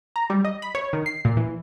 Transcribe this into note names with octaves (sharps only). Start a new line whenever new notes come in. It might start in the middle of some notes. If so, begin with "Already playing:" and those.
A#5
G3
D#5
B5
C#5
D#3
C7
A#2
E3